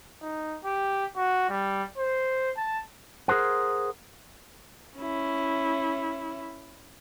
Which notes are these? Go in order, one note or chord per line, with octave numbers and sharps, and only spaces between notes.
D#4
G4
F#4
G3
C5
A5
G#4 A#4 C5 F#5
C#4 E4